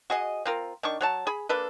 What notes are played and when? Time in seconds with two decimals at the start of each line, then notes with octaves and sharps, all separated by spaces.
0.10 F#4 G#4 D#5
0.45 C4 F4 A#4
0.83 D#3 D4 C#6
1.01 F#3 C#5 A5
1.27 G#4 B5
1.49 A#3 D4 A4 B4